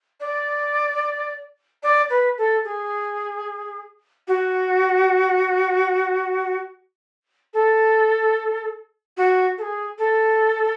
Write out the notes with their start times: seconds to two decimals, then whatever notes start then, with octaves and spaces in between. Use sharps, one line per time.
0.20 D5
1.83 D5
2.10 B4
2.38 A4
2.64 G#4
4.27 F#4
7.53 A4
9.17 F#4
9.58 A4
9.61 G#4
9.98 A4